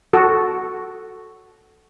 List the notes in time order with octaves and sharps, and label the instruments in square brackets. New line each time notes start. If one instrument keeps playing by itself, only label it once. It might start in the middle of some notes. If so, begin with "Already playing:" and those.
[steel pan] F#4 A4